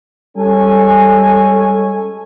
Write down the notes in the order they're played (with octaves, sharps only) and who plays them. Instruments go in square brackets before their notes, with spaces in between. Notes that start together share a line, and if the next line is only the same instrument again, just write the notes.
[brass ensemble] G3 G#3 C#4 A4 G#5